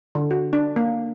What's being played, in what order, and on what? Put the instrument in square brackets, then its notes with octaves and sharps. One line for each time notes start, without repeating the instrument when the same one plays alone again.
[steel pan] D3
F#4
D4
A#3